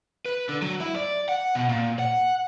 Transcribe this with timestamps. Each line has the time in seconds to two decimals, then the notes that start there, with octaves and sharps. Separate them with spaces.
0.26 B4
0.49 D3
0.62 F#3
0.81 E4
0.96 D5
1.29 F#5
1.55 B2
1.69 A#2
1.99 F#5